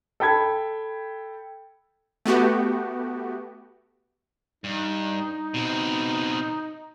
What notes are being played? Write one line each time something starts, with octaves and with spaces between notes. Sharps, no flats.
A4 G5 B5 G#6
A3 B3 F#4 G4
G2 D#4
B2 C4